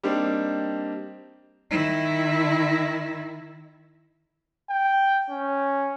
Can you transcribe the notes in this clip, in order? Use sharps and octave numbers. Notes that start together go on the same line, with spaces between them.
G3 A#3 C4 D4 D#4
D#3 E4
G5
C#4